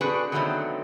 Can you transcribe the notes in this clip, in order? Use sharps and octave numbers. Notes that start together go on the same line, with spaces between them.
C4 D4 F#4 G#4 A4 B4
D3 D#3 F#3 A3 B3 C4